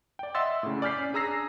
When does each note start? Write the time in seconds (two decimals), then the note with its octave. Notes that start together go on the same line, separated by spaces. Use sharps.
0.19 D5 G5
0.35 D#5 E5 F#5 C6 E6 A6
0.63 A2 C#3
0.82 D5 G#5 F6 G6 B6 C7
0.98 C#4
1.13 D4 G#4 A#5 E6 A#6 C7